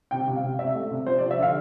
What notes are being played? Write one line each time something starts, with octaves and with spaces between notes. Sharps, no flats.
C3 G5
C3
F5
C3
C3 E5
A3
C3
F3 C5
D5
F3
E5
D3 F5